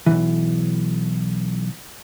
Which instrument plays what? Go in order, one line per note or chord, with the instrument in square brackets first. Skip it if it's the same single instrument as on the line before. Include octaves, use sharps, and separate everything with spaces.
[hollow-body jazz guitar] B1 G#2 E3